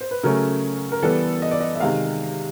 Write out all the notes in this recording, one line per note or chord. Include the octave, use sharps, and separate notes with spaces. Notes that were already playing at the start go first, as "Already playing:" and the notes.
C5
B4
C#3 F#3 A3 C#4 A#4
A#4
E3 G3 B3 A4
D#5
D5
D#5
E5
C3 D#3 G#3 F5